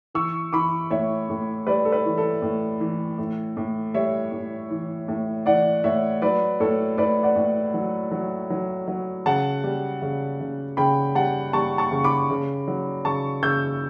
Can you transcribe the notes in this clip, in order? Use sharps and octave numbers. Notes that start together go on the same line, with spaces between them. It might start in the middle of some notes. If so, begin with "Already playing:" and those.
E3 C#6 E6
E3 B5 D6
A2 C#5 E5
A2
G3 B4 D5
A4
B4
E3
A4
A2
E3
A2
A2
G3 C#5 E5
A2
E3
A2
E3 D5 F#5
A2 C#5 E5
F#3 B4 D5
A2 A4 C#5
A2 B4 D5
D5 F#5
A2
F#3
F#3
F#3
F#3
C#3 F#5 A5
G3
C#3
C#3
C#3 G5 B5
G3 F#5 A5
G3 A5 C#6
A5 C#6
C#3
B5 D6
C#3
F#3
C#3 A5 C#6
C#3 E6 G6